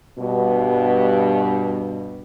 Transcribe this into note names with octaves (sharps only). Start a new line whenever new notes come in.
G2 B2